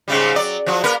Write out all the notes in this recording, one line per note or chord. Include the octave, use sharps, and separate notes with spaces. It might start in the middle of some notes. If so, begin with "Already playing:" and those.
G#2 C#3 G3
F#3 D5
F3 F#3 F#4
A#3 A#4 B4